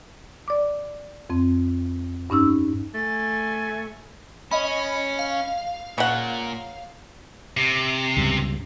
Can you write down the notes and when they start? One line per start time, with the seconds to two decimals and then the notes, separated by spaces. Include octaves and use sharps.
0.48 D5 D6
1.30 F2 C4
2.30 G2 C#4 D#4 E6
2.94 A3 G#5 A6
4.51 C#4 D#5 B5
5.19 F5
5.98 A#2 C#3 F#5
7.57 C3
8.17 C#2 G2 B2